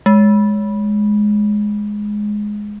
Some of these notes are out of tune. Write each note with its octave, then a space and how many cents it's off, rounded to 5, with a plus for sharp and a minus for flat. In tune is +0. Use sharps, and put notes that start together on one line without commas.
G#3 +5